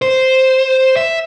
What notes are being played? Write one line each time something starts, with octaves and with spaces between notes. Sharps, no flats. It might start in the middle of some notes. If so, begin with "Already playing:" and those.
C5
E5